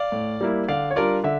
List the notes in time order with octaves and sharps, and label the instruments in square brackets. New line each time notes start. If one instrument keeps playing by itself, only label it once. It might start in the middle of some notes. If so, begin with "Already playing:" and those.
Already playing: [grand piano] D5 F5
A2
G3 A#3 E4
D3 D5 F5
C#5
G3 D4 F4 A#4 D5
D3 E5